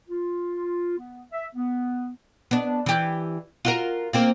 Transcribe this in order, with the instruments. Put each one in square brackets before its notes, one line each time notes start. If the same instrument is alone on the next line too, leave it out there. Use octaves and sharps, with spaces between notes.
[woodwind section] F4
B3
E5
B3
[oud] B3 D4
E3 G4
F4 F#4 A#4
A#3 C4 F4